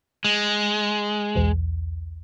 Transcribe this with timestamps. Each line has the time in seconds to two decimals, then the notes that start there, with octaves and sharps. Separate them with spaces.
0.24 G#3
1.35 B1 E2